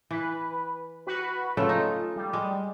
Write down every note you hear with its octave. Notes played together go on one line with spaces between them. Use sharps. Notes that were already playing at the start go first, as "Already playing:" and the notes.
E3 B4
F#4 B4
C#3 A3 F4 A4
D#4
G3
G#3